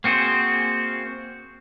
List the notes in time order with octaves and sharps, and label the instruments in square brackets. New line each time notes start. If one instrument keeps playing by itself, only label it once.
[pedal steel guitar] A#3 C4 F#4 G#4 C5